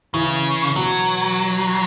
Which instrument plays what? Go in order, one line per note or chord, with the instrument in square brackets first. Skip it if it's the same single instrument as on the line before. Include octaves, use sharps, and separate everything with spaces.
[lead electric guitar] C#3 [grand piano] E3
[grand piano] B2 [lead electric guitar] F#3